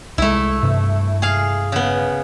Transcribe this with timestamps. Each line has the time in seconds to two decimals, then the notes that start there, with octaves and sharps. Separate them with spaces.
0.18 C2 G#3 A3 E4
0.63 G2 C3
1.22 G#4 F5
1.72 C#3 B3